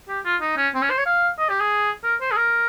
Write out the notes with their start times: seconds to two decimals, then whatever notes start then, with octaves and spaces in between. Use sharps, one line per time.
0.08 G4
0.25 F4
0.41 D#4
0.57 C#4
0.74 C4
0.82 C#4
0.90 C5
0.98 C#5
1.06 F5
1.39 D#5
1.50 G4
1.60 G#4
2.04 A#4
2.21 C5
2.32 G#4
2.37 A#4